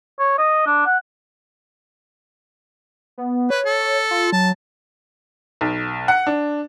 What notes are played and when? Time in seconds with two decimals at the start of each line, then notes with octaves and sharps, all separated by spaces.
0.20 C#5
0.38 D#5
0.66 D4
0.86 F#5
3.18 B3
3.50 B4 C#5
3.66 A4
4.11 F4
4.32 F#3 A5
5.61 B1
6.08 F#5
6.27 D4